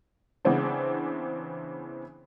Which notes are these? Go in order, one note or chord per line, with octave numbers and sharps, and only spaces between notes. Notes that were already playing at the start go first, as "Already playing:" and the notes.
C#3 E3 B3 C4 D4